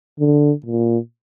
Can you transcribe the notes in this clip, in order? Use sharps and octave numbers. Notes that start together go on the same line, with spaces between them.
D3
A#2